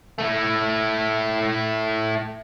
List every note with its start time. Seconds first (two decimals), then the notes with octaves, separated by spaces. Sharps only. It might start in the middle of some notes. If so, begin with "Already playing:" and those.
0.18 A3 E4